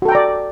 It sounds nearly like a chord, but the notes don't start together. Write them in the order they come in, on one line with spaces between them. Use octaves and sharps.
F#4 A4 G5 A#5 D5